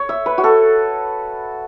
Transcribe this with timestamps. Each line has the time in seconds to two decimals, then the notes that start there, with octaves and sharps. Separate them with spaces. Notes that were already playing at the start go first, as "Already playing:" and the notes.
Already playing: C#5
0.09 E5
0.26 B4
0.38 F#4
0.44 A4